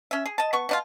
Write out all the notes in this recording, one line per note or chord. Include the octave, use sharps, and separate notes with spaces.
C#4 E5
G#4
D#5 A5
B3 C#6
B2 D4 F4